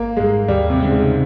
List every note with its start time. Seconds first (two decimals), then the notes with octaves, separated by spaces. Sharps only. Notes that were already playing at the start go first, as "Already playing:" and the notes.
Already playing: G#1 A#3
0.17 G#2 G3 G#3
0.48 D#2 G3
0.70 C3
0.80 C#3 G#3 C4
0.91 G#2